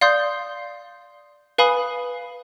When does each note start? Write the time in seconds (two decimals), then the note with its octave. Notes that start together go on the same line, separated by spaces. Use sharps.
0.01 D5 F5 C6 D#6 G6
1.58 B4 F5 G#5 B5 D#6